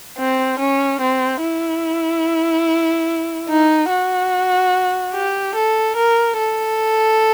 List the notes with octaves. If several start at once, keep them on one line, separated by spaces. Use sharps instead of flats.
C4
C#4
C4
E4
D#4
F#4
G4
A4
A#4
A4